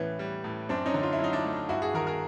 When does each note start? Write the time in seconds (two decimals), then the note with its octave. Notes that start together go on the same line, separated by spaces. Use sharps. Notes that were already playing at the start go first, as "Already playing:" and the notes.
Already playing: A2 E3 B3 C#4
0.19 G3
0.44 A2
0.69 F#2 C4 D4
0.86 C#4 D#4
0.94 D3
1.03 F4
1.13 E4
1.19 F#3 D#4
1.33 D4 E4
1.45 A3
1.69 G2 E4 F#4
1.82 F#4 G#4
1.94 D#3 G#4 A#4
2.07 G#4 A#4